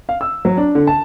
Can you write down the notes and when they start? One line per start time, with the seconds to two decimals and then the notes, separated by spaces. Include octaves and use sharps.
0.09 F5
0.21 E6
0.45 F#3
0.57 D4
0.75 D3
0.87 A5